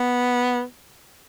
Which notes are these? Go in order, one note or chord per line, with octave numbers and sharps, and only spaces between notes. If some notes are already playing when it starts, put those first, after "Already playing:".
Already playing: B3